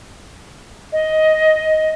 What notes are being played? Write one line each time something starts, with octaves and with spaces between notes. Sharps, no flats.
D#5